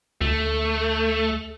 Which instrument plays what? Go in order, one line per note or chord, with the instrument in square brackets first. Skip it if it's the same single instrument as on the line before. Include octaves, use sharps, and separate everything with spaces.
[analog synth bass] D2 [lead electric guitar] A3